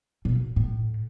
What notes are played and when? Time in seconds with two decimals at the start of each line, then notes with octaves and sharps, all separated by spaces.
0.25 B2
0.56 A2